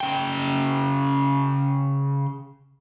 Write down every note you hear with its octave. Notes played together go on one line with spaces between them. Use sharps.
C#3 G5